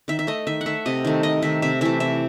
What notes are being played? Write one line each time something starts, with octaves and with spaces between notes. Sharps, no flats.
D#3 E5
E5
A3 D#5
D#3 E5
F#5
A3 E5
C3 D#5
D#3 A3
C3 D#5
D#3 A3 E5
C3 E5
E3 A3 E5
C3 E5